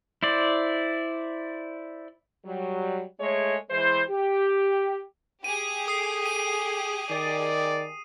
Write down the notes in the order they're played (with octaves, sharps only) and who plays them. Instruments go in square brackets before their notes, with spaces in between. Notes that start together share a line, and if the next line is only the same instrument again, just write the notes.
[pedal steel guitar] E4 C5 D5
[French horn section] F#3 G3
G#3 A3 C#5
E3 G#3 C5
G4
[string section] G4 G#4 [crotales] D#7
[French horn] A4 [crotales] D#6 C7
[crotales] D#7
[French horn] D#3 [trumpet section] D5